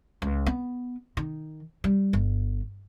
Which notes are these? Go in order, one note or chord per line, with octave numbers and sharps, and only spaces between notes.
C#2
B3
D#3
G3
G1